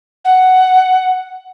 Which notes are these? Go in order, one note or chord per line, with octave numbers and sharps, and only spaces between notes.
F#5